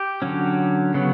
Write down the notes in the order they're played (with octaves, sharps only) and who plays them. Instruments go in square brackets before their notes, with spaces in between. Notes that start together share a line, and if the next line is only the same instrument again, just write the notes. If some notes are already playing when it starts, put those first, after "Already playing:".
Already playing: [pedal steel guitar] G4
D3 F#3 C#4
C#3 F#3 B3